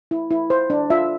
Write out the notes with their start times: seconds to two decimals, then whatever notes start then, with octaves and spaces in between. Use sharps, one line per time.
0.11 E4
0.31 E4
0.50 C5
0.70 D4
0.90 F4 E5